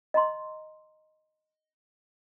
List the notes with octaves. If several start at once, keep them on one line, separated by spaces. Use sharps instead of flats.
D#5 A#5 C6